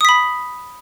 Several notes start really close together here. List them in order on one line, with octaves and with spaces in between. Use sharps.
D#6 B6 B5